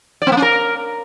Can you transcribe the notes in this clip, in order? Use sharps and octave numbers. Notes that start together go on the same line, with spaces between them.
D5
C4
A#3
C#4
A#4